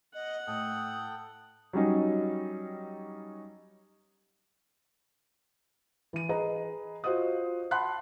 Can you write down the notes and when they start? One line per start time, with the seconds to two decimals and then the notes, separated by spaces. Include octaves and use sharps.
0.14 D#5 F#5
0.47 A2 A4 G5 D#6
1.73 F#3 G3 C#4 D#4
6.13 E3 D#7
6.29 G#4 B4 D#5 A#5
7.04 F4 F#4 C5 D#5 D#6
7.71 F#5 A5 B5 C6 F#6